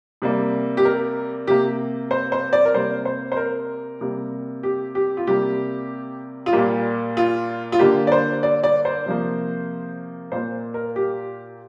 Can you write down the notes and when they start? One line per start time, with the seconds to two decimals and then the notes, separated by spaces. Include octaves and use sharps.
0.22 C3 G3 A#3
0.77 G4
0.85 A#4
1.47 C3 A#3 G4
2.11 C5
2.32 C5
2.53 D5
2.65 A#4
2.74 C3 G3 A#3 C5
3.05 C5
3.32 C5
3.37 A#4
4.01 C3 G3 A#3
4.63 G4
4.95 G4
5.17 F4
5.27 C3 G3 A#3 G4
6.46 F4
6.53 A#2 G3 A#3 G4
7.17 F4
7.72 F4
7.79 D3 A#3 G4
8.07 D5
8.12 C5
8.43 D5
8.64 D5
8.85 C5
9.06 C3 F3 A#3
10.32 A#2 A#3 C5
10.74 A#4
10.96 G4